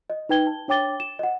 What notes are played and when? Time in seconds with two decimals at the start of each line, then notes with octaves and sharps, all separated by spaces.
0.10 D#5
0.29 D#4 B4 G5 G#6 G7
0.47 A5
0.68 D4 C#5 G5 D6 A6 G7
1.00 E7
1.19 D#5 F#5